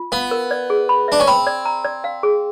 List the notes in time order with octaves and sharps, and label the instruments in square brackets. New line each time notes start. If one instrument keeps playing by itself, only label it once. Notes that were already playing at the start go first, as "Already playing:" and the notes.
Already playing: [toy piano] F4
[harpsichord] B3 [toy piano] F5
[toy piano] A#4
D5
G#4
B5
[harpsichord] D4 [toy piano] E5
[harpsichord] C#4
[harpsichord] C4 [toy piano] B5
[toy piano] D5
A#5
D5
F5
G#4